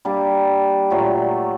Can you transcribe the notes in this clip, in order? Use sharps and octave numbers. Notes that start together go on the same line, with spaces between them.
G3 A#3 D4
A#2 F#3 A3